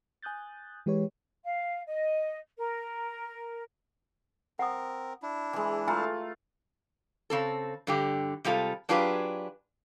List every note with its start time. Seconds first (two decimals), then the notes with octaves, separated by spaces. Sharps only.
0.22 G#5 D#6 F#6 G6 A6
0.86 E3 G#3 G4 B4 C#5
1.44 F5
1.86 D#5
2.57 A#4
4.59 C4 A#4 F#5 D#6
5.22 D4 E4
5.53 E3 G#3
5.88 A3 F4 G#5 A#5
7.30 C#3 C4 A4
7.87 G2 D3 G4
8.45 C3 G3 G#3 F4 A4
8.89 F#3 D4 F4 G4 G#4 B4